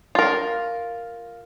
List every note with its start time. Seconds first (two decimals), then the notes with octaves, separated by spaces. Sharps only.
0.15 F4 A#4